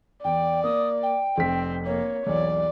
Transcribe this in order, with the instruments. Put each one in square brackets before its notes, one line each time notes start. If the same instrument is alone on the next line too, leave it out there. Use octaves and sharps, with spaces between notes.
[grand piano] E2 [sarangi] D5 [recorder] G5
[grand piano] A#3 [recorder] D#6
[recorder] G5
[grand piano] F1 B6 [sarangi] C4
[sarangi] A#3 [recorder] C#5
[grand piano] B1 E2 [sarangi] D5